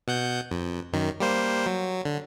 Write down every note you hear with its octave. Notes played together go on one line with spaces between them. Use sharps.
B2 F#5 G6
F2
F#2 D#3
G3 A#3 C5
F#3
D3